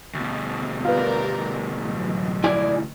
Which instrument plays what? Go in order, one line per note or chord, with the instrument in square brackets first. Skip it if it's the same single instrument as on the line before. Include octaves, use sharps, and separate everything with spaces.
[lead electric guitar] D2 B2
[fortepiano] B3 F4 [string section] G4 A#4 D5
[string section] A2 E3 F#3
[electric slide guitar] E4 D5 G#5